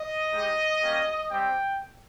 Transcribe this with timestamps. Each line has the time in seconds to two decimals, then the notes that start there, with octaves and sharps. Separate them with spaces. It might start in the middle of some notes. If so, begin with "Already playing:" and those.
Already playing: D#5
0.32 G#3 D#4 G4
0.81 G3 A#3 C#4 G4
1.30 G3 C4 G4 G5